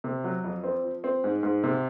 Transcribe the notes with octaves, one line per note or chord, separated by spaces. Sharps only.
C3
F#3
F2
C4
F3
C4
G#2
G#2
C3